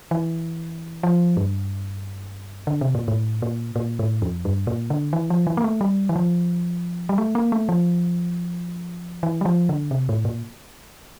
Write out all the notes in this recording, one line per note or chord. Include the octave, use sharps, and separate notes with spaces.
E3
F3
G2
D3
C3
A#2
A2
A#2
A#2
A2
F2
G2
A#2
D3
E3
F3
E3
A#3
A3
G3
E3
F3
G3
A3
A#3
A3
F3
E3
G3
F3
D3
C3
A2
A#2